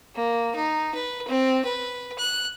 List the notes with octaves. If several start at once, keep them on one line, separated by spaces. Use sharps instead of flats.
A#3
D#4
B4
C4
B4
F#6